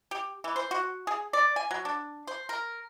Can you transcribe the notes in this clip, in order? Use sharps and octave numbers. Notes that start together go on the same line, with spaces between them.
G4
E3
C5
F#4
G#4
D5
G#5
F#3
D4
C5
A#4